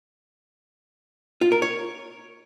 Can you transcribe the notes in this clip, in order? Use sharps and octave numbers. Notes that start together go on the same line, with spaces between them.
F4
A#4
C#5